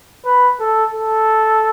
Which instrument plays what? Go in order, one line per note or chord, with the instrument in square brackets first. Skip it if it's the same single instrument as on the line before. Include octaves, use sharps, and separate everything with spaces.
[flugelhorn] B4
A4
A4